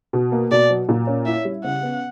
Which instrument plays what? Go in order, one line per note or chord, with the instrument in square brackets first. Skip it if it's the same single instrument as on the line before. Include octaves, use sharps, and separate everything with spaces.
[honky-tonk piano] B2
A#3
[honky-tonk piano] B2 [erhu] D5
[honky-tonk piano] F#3
A#2
C#4
[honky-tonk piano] E4 [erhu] E5
[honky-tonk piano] G3
[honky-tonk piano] C#3 [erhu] F#5
[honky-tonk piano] B3